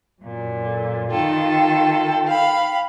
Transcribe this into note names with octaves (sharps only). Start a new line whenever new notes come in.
F#2 A#2
A4
D#3 F4 A4 G5
F5 B5